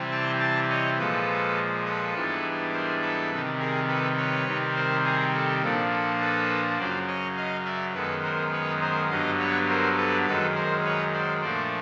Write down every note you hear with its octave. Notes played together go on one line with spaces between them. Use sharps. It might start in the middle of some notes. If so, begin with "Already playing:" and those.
Already playing: C3 E3 G3 C4
G5 A5
G5 A5
C#5 D#5
A#2 F3 G#3 A4 B4
A4 B4
G#2 E3 G3 B3 D4
A#4 C5
A4 B4
C3 D#3 G3
G#4 A#4
A4 B4
B4 C#5
C3 D#3 G3 C4
A#4 C5
G#4 A#4
A4
A#2 F3 A#3 D4 A4
A4
A4 B4
F#2 C#3 F#3 C5 D5
C#5 D#5
D#5 F5
D5 E5
F#2 D#3 G#3 B3 A4 B4
A#4 C5
B4 C#5
A#4 C5
G2 D3 F#3 B3 D#5 F5
B4 C#5
A#4 C5
A4 B4
F#2 D#3 G#3 A4 B4
A#4 C5
B4 C#5
C5 D5
A#2 F3 A3 D4 C5 D5